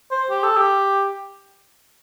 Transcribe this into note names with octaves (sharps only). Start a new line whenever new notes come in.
C5
G4
A4
G4